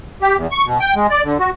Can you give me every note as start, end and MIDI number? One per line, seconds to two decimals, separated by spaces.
0.22 0.36 67
0.37 0.47 40
0.51 0.65 85
0.66 0.78 47
0.80 0.94 79
0.95 1.07 56
1.10 1.22 74
1.24 1.38 50
1.40 1.50 66